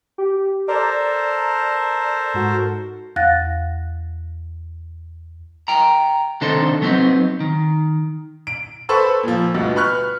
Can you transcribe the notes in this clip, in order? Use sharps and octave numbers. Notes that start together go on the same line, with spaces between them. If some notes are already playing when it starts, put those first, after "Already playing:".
G4
A4 A#4 C5 D5 A#5
G#2 F#4
E2 F5 F#5 F#6 A6 A#6
G5 A#5
C3 D#3 D4 D#4 A4 C5
F#3 B3 C4 D4 D#4
D#3
D7
A4 B4 C5 B5 C#6 E6
A#2 F3
D2 G2 B2
B4 B5 C#6 F6 F#6